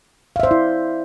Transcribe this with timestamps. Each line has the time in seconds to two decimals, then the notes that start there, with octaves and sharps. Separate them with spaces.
0.36 F5
0.40 E5
0.43 C5
0.47 D5
0.51 E4